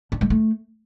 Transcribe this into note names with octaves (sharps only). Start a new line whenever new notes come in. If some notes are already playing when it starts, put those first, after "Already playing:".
D4
G#3
A3